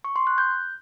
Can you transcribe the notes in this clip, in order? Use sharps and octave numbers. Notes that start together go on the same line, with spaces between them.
C#6
C6
F#6
G6